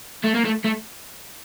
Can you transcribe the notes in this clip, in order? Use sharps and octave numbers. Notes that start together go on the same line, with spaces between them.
A3
A#3
A3
A3